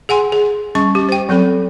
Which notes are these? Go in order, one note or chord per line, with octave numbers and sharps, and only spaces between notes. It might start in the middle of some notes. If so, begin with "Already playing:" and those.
G#4 F#5 G#5 C6
G#4
G3 C#4 C#6
G4
C5 G5
F#3 C4 A4 B5